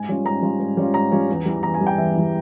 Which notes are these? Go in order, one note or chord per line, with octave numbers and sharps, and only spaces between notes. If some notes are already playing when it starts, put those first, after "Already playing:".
Already playing: G#2 G#5
G3 C#4 F4
G#2 A#5
G3 C#4 F4
G#2
G3 C#4 F4
G#2 A#5
G3 C#4 F4
E2
E3 G3
E2 A#5
G#5
E3 G3
G5
E2 E5
E3 G3